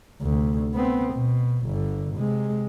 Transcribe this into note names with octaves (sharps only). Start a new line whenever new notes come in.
D2 C3
B3 C4
B2
G1 D3
C3 G#3